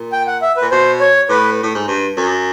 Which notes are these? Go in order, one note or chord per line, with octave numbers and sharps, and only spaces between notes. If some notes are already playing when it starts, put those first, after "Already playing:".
Already playing: A#2
G5
F#5
E5
B4
A#2
B2 C5
C#5
A2 B4
A2
G#2
G2
F#2